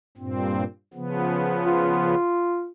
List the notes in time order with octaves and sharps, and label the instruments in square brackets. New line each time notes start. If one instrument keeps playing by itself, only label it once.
[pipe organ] G2 A#2 C4
C#3 F3 B3
[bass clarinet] F4